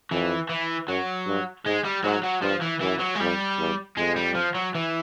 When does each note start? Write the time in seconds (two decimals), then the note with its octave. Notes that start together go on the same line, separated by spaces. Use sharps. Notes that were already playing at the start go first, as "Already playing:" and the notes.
0.11 F2 E3
0.49 E3
0.88 F#2 F#3
1.27 G2
1.66 G#2 G#3
1.85 G3
2.04 G#2 F#3
2.24 F#3
2.42 G2 F3
2.61 E3
2.81 F#2 E3
3.00 F#3
3.15 G#3
3.20 F2 G3
3.59 E2
3.97 F2 G#3
4.16 G3
4.35 F3
4.55 F#3
4.75 E3